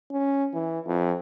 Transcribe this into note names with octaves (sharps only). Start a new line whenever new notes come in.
C#4
E3
F2